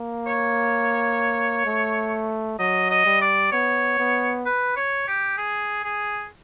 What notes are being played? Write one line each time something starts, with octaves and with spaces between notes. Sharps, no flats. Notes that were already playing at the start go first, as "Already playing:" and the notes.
Already playing: A#3
C#5
A3
F#3 D#5
D#5
G3
D5
B3 C#5
B3
B4
C#5
G4
G#4
G#4